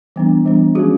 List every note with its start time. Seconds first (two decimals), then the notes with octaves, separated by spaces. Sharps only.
0.16 E3 G3 B3 D4
0.46 E3 G3 B3 D4
0.75 F3 G#3 C#4 F#4 G#4